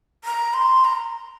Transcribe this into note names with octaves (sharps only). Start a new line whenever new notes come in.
A#5
C6
A#5